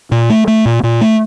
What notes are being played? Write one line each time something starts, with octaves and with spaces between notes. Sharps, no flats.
A#2
A3
A3
A#2
A#2
A3